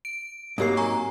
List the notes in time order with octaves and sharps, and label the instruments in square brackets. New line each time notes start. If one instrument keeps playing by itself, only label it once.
[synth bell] D7
[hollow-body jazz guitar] G#2 F#3 A#3 [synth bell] C4 G4 C7
[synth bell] G#5 A#5 C#6